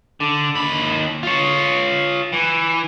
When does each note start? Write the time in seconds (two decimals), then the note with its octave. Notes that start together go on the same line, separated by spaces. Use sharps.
0.20 D3
0.55 D#2 B5
1.23 F4 C#5
2.33 E3